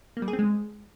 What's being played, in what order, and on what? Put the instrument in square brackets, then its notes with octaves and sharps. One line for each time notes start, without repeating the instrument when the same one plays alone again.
[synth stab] A#3
G3
G#4
C4
G#3